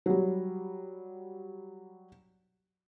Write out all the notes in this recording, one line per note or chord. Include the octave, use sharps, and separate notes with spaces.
F#3 G3